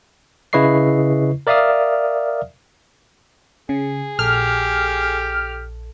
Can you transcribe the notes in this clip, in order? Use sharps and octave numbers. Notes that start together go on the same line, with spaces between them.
C#3 E4 B4 D#5 C#6 C7
A#4 D5 E5 F5 D#6 F6
C#3 G#4
A#1 G4 A4 F6